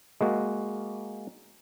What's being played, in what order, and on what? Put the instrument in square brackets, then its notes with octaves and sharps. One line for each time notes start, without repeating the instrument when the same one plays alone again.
[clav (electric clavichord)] G#3 A#3 F#4